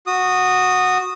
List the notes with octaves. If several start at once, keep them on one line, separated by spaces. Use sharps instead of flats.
F#4 D#6